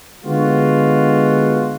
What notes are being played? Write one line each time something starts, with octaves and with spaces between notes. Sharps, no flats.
D3 G#3 B3 F4 F#4